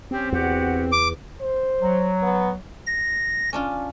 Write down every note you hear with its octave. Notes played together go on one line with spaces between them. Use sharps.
C4 C#4 G4
E2 F#4 G4 F#5
D6
C5
F#3
B3
A#6
C#4 D4 F4